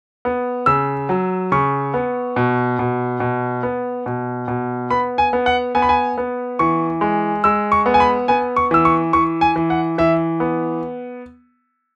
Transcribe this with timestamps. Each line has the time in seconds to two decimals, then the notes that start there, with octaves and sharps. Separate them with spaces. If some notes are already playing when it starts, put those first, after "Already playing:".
0.25 B3
0.66 C#3 E6
1.09 F#3
1.52 C#3 C#6
1.94 B3
2.36 B2
2.79 B2
3.20 B2
3.63 B3
4.06 B2
4.48 B2
4.90 B3 B5
5.18 G#5
5.33 B3
5.46 F#5
5.75 B3 G#5
5.82 B5
5.89 G#5
6.18 B3
6.59 E3 C#6
7.01 G#3
7.44 G#3 E6
7.72 C#6
7.86 B3
7.94 G#5
8.00 B5
8.28 B3 G#5
8.56 C#6
8.71 E3 E6
8.85 C#6
9.13 E3 C#6
9.41 G#5
9.56 E3
9.70 F#5
9.98 E3 E5
10.40 B3